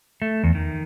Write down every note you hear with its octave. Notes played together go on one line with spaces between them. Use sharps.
A3
E2
D#3